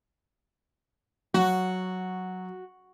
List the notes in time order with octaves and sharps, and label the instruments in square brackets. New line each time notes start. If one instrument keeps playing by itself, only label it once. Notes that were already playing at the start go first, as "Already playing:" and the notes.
[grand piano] F#3 [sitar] F#4